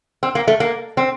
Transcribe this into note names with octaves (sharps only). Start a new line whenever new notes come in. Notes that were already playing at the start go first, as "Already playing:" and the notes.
C4
A#3
A3
A#3
C4